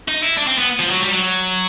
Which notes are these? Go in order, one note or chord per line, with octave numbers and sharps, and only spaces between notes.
D#4
E4
D4
C4
B3
F3
F#3
G3
F#3